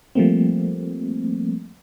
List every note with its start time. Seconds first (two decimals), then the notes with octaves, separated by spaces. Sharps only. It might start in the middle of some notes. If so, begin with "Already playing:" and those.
0.15 F3 G3 A3 A#3 C4